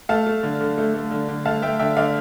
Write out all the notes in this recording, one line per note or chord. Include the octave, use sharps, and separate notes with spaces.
A3 F5 A5
A3
D3
D3
A3
A3
D3
D3
A3 F5 A5
A3 E5 G5
D3 E5 G5
D3 D5 F5